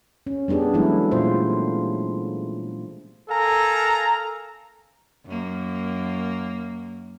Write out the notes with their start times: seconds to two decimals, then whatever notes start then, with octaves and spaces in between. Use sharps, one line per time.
0.27 C#4
0.48 G3 B3 D4 G4 G#4
0.74 E3 F#3 G#3 A3 B3 E4
1.11 A#2 F4 C5
3.28 A4 A#4 F5 G#5 A#5
5.26 F#2 A#3